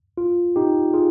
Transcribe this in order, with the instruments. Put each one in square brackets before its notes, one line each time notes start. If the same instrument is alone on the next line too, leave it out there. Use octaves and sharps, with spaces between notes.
[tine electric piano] F4
D#4 G4
F4 G#4